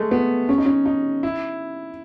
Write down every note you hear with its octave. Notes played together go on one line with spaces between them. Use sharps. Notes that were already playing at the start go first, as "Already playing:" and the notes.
Already playing: G#3 A3
B3
C#4
D#4
C#4
D#4
E4